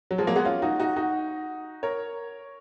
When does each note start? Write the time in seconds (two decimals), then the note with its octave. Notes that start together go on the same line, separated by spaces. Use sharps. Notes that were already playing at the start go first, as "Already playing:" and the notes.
0.11 F#3
0.18 F3 G#3
0.27 F#3 A#3
0.36 G#3 B3
0.45 C#4 F4
0.62 D#4 F#4
0.80 D#4 F#4
0.96 D#4 F#4
1.83 A#4 C#5